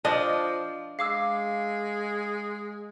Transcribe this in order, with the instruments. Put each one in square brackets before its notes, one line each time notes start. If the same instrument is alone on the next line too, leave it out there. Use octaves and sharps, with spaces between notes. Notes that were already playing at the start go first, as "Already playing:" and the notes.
[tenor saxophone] F3 [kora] D4 D#5
[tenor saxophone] G#3 [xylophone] F5 D6 E6